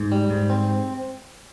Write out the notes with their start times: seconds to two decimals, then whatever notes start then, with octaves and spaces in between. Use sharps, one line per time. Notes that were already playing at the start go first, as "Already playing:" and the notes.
Already playing: G#2
0.12 G3
0.30 G#2
0.50 C4